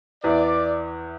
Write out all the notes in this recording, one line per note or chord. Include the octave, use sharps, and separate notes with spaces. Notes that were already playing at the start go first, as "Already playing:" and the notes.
E2 E3 B3 E4 D5